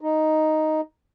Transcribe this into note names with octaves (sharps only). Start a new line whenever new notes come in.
D#4